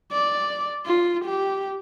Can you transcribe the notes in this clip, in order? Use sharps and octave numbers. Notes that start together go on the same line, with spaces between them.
D5
F4
G4